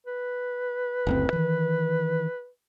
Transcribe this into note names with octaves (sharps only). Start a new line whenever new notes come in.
B4
F#1 D2 C4
D#3 E3